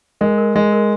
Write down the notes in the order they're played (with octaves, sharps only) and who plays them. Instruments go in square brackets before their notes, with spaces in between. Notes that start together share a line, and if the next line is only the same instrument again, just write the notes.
[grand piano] G#3 [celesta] A#4
[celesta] A#4
[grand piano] G#3 [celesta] A#4
[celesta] A#4